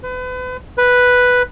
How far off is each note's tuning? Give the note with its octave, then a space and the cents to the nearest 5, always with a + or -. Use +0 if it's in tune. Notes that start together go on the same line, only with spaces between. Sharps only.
B4 +35
B4 +0